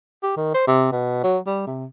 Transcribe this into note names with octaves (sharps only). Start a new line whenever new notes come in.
G4
D#3
C5
C3
B2
F#3
G3
C3